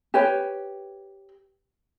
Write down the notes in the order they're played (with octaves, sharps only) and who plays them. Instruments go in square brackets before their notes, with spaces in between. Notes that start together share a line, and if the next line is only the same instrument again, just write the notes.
[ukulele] G4 B4 C#5 G5